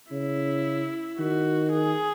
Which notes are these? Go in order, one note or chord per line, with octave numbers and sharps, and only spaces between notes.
C#3 E4
D#3 F#4
G#4